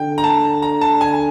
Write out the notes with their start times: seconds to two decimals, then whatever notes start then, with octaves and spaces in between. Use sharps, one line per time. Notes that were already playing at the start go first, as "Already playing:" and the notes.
Already playing: D3 G5
0.18 A#5
0.24 A5
0.62 A#5
0.81 A5
1.01 G#5